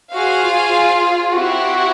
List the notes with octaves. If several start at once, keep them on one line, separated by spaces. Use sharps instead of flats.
F#4 G#4 C5 F5
F4
F4
C4 E4 F#4 G4